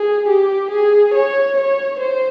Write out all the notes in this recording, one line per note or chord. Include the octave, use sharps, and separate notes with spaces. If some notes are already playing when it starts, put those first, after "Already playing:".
Already playing: G#4
G4
G#4
C#5
C#5
C5